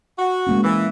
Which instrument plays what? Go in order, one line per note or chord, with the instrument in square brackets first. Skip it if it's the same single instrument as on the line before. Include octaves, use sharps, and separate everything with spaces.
[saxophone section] F#4
[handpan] G#3 A#3 C#4
[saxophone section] E3